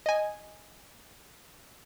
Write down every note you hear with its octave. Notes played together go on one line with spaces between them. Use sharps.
D#5 G#5